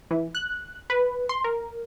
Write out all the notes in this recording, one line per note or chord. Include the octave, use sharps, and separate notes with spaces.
E3
F#6
B4
C6
A#4